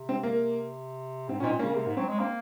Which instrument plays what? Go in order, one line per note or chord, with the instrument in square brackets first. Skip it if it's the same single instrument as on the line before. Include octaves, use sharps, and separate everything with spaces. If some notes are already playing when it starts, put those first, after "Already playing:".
Already playing: [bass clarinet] C3
[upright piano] C4
A#3
[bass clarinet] G#2 [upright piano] C4
[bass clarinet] A#2 [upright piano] C#4
[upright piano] C4 D#4
[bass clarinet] A#2
[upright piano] A#3 C#4
[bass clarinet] C#3
[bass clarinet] C3 [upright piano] A#3
[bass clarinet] G#2
[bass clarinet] F#3 [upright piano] C4
[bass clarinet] G#3
[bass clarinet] A#3 [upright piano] C4